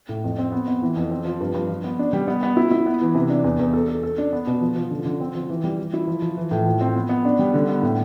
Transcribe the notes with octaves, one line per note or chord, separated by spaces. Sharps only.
A2
F2
C4
B3
B3
E3
F2
C4
F3
G2
G2
F3
B3
D4
G3
B3
B3
E4
E4
B3
E3
C3
D4
E2
E2
A4
A4
A4
D4
B3
B2
F3
F3
D3
D3
C4
F3
E3
G3
E3
E4
F3
F3
E3
A2
F3
C4
B3
B3
D4
G3
D3
B3
A2